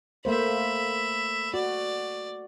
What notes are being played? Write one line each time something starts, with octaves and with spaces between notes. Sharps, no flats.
A3 A#3 C5 E5 B5
F#4 D5